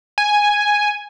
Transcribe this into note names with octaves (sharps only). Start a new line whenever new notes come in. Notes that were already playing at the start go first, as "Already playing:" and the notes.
G#5